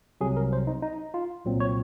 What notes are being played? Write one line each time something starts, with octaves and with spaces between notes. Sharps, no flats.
C2 C3 F#3 G#4
A#4
C5
D#4
D#4
F4
C2 A#2 F#3 C4
C#5